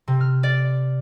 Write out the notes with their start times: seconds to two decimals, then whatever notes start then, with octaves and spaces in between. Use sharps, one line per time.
0.08 C3
0.21 F6
0.43 D5